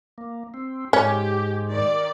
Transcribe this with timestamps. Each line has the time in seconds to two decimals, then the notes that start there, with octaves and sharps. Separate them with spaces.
0.18 A#3
0.54 C4
0.93 G#2 G#3 C#4 G4
1.67 D#3 D5